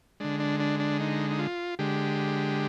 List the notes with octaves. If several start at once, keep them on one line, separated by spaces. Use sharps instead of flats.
D3 G#3 D4
D4
D4
D4
D#4
D#4
F4
D3 G#3 G4